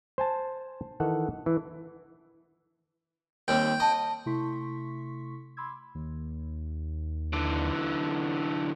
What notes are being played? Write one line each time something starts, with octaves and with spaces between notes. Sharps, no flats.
C5 G#5 A5
D#3 E3 A4 F#5
E3
D#2 G3 C4 G5
D#5 A5 C6
C3 A3 E4 C6 C#6 B6
B5 C6 D6 E6 G#6
D#2
D3 E3